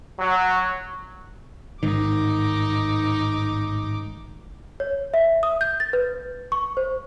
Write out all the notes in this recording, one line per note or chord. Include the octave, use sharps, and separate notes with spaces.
F#3
A1 G#2 D#3 D#4 D6
C#5
E5
D#6
G6
A6
B4
C#6
C5